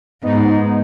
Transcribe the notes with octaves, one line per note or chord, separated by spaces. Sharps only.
G#2 B3 D#4